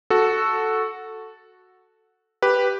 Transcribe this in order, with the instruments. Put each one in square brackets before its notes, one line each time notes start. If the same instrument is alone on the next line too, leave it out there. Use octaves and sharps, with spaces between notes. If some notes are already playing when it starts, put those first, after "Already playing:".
[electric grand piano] F#4 A4
G4 B4